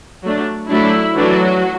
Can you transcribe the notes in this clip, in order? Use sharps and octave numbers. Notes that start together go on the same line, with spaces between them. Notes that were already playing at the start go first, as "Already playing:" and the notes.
F#3 A3 D4
F#3 A3 D4 E4
E3 F#3 A3 D4 F#4